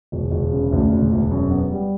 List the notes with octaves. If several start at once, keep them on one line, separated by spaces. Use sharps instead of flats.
E1
E1
C#3
D2
E1
E1
F#2
B3
G3